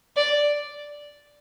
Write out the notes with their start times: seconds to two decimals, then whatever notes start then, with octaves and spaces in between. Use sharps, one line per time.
0.16 D5